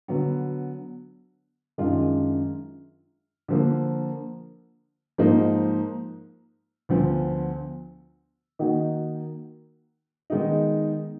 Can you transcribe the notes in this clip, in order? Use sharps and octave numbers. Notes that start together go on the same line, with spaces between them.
D3 F#3 B3
F#2 D#3 G#3 D4 F4
D3 F3 A#3
G#2 F3 A#3 D#4
D2 D3 F3 B3
D#3 A#3 D#4 F#4
D#3 G#3 B3 D#4